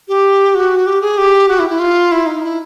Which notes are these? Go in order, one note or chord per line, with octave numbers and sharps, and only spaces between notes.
G4
F#4
G4
G#4
G4
F#4
E4
E4
F4
E4
D#4
E4